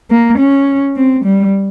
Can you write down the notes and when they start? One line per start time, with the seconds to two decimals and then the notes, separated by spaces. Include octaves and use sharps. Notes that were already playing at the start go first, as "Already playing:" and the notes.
0.10 A#3
0.39 C#4
0.96 C4
1.25 G3